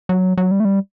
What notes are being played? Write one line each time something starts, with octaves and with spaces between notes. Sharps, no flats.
F#3
F#3
G3
A3
G3